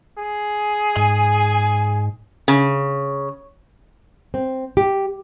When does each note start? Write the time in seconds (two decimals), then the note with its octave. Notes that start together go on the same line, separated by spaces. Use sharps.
0.18 G#4
0.97 G#2 G#5
2.48 C#3
4.34 C4
4.77 G4